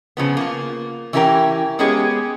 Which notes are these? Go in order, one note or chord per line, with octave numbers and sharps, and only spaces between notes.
C#3 F3 B3
A#3 F4
E3 C#4 E4 G4 A#4 G5
G#3 B3 C#4 G4 G#4